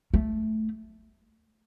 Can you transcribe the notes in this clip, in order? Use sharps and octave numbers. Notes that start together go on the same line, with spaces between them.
A3